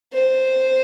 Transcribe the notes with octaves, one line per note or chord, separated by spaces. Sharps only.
C5